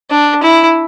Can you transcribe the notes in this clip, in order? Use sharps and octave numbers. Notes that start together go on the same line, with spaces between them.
D4
E4